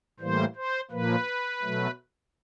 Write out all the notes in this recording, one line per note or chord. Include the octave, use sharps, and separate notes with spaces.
A2 E3 G3 A#3 C5
C5
A#2 F3 A#3 B4
B2 F#3 A3